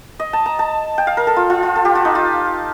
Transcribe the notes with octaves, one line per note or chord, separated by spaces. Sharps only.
D#5
A5
A#5
A5
G5
F5
A#4
A4
F4
F4
F4
A4
G4
F4
D#4
F4